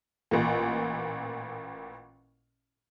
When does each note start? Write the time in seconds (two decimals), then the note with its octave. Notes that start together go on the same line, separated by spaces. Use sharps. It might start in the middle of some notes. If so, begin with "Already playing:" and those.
0.31 A1 A#2